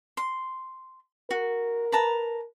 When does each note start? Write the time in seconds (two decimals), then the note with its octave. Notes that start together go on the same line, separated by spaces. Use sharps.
0.17 C6
1.31 F#4 A#4
1.92 B4 A5 A#5